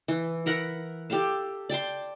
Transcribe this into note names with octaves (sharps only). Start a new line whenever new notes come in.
E3
E4 A#4 F#5 B5
G4 A4 F5 A5
D5 G5 A5 C6